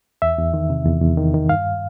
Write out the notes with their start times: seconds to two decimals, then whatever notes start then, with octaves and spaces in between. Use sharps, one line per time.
0.22 E2 E5
0.38 E2
0.54 D#3
0.70 C3
0.86 E2
1.02 E2
1.17 D#3
1.34 D#3
1.49 G2 F5